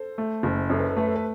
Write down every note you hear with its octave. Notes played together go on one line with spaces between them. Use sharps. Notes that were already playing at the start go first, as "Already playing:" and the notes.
Already playing: A4 C5
A3
F#1
F#2 A4
B4
A4
A3 B4
A4
B4